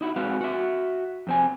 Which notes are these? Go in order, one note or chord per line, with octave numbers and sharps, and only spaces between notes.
D#4 E4 F#4
G#3 C4 F#4 B4 F5
F#4 E5
F2 C4 G#5